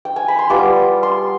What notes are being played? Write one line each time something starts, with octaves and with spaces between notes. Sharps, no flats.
G5
G#5
B5
C6
G3 B3 F4 D6
C6